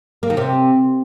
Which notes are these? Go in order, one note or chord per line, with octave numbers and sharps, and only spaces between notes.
A#3
D#3
C3